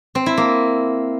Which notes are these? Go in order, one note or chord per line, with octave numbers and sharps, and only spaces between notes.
C4
E4
A#3